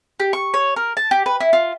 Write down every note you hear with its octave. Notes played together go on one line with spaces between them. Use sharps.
G4
C#6
C#5
A#4
A5
G4
B4
E4
F4